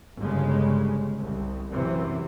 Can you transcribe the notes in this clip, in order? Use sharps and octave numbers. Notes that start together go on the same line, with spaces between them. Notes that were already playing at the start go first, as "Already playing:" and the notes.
G1 C#3 G#3
C2
F#2 C3 E3